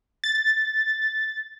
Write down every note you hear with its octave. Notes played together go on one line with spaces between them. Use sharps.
A6